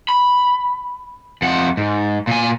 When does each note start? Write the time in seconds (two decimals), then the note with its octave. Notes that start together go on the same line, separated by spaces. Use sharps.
0.09 B5
1.42 F2 F#5
1.77 G#2
2.27 A#2 G#5